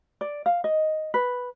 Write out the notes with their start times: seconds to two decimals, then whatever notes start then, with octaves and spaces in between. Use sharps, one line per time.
0.21 D5
0.46 F5
0.64 D#5
1.14 B4